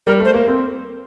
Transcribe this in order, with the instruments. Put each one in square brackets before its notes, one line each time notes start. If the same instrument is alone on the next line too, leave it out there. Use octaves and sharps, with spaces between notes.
[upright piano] G3 [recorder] A#4
[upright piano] A3
[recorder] C5
[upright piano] A#3
C4